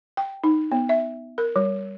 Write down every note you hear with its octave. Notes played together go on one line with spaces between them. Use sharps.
G5
D#4
B3
E5
A#4
G3